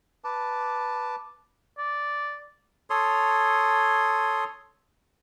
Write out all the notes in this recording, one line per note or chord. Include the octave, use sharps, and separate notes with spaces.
B4 A5 D6
D5
A4 C#5 C6 D#6